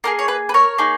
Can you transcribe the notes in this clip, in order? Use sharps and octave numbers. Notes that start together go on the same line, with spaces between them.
A#3 D#4 G#4 A#4
C#5
B4
B4
A#4 C#5
A#3 D#4 G#4